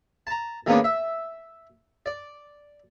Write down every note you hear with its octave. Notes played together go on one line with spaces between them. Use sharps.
A5 A#5
D#3 G#3 A#3 B3 C#4 D4
E5
D5